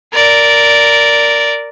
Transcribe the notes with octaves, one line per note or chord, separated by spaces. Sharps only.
A#4 D5